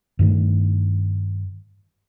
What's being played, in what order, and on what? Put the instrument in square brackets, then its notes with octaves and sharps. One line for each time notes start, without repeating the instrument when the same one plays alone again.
[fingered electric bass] G2 D#3 A3